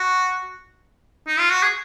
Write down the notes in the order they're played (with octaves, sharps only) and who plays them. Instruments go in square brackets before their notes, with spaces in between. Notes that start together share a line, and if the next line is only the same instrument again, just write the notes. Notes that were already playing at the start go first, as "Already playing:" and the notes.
Already playing: [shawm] F#4
D#4
F4
F#4
G#4